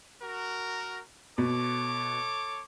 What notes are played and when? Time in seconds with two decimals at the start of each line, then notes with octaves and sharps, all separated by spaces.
0.22 F#4 A#4
1.38 B2 A4 C#5 D6